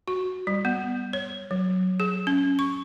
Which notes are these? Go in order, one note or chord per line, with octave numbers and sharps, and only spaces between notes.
F#4
G3
B3
C#5
F#3
G#4
C#4
C#6